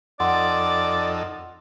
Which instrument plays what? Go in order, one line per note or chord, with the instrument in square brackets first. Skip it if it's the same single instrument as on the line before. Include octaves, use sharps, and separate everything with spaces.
[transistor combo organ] F2 D#4 A4 [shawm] D5 [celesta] F#5 C6